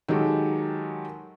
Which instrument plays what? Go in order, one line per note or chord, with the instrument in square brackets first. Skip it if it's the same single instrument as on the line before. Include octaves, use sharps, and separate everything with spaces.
[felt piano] D#3 F#3 G#3 G4 A4